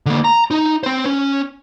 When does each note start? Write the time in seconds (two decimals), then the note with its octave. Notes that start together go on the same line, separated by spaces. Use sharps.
0.06 D3 A#3
0.24 A#5
0.51 D#4
0.83 C4 C5
1.06 C#4